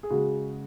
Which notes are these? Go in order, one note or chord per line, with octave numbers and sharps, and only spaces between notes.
G#4
C#3 G#3 F#4